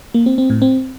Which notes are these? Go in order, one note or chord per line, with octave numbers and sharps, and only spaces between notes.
A#3
C4
C4
A2
C4